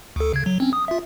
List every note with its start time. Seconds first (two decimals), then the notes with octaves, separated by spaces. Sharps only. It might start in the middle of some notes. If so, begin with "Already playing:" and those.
0.16 D2 A4
0.33 C#3 G#6
0.46 F#3
0.60 C4 C#4
0.73 D#6
0.88 F4 E5